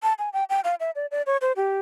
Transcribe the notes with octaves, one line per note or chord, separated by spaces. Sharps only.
A5
G#5
G5
G5
F5
E5
D5
D5
C#5
C5
G4